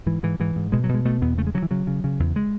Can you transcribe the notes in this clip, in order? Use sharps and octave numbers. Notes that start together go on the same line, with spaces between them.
G#2 E3
G#2 E3
G#2 E3
G#2
B2 G#3
F#3
B2
G#3
B2 A3
E2 B3
C#3 A3
G#3
C#3 F#3
E3
C#3 F#3
C#3
C#3
E2
G#3